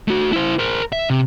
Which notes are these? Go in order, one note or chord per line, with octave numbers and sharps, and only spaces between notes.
A3 F#4
E4 C5
A#4 C5
E5
C3